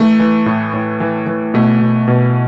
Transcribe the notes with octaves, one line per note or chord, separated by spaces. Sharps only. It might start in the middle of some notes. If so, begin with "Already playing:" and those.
Already playing: E3 A3
E3
A2
A2
E3
E3
B2 A3
B2
B2